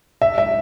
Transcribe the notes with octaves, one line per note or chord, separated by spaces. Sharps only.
E5
E5